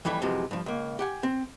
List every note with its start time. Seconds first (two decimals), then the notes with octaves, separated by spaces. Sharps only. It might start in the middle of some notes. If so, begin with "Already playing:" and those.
0.05 F2 E3 G3 A3
0.22 F#2 C3 E3 F3 G#3
0.51 G2 F3
0.66 C#2 A#3
0.99 G4 F#5 G#5
1.23 C4